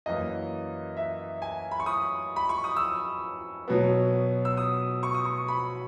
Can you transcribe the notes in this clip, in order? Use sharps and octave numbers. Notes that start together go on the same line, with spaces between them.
F#2 E3 A#3 D#5
E5
G#5
B5
C#6
D#6
B5
C#6
D#6
E6
B2 F#3 B3
E6
D#6
C#6
D#6
C#6
B5